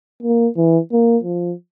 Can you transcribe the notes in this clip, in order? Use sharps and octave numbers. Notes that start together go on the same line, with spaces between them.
A#3
E3
A#3
F3